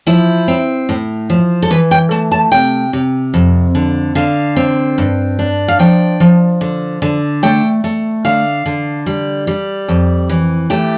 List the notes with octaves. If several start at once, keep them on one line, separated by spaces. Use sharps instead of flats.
F3 E4
C4
A2
F3
A4
E3 B4
G5
A3 A5
A5
C3 G5
C3
F2
D3
D3 F5
C4
G2
D4
F5
F3 G5
F3
D3
D3
A3 G5
A3
D3 F5
D3
G3
G3
F2
E3
A3 G4